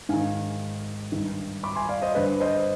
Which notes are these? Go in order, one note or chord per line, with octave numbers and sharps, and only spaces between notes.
G#2 D#3 F5 G#5
G2 D#3
B5 D6
G#5 C6
D5 F5
C5 D#5
G2 D3 B4 D5
C5 D#5